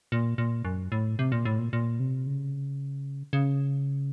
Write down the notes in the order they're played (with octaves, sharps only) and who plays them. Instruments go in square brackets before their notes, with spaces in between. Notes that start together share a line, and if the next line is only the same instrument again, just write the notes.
[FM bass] A#2
A#2
F#2
A2
C3
A#2
A2
A#2
A#2
C3
C#3
C#3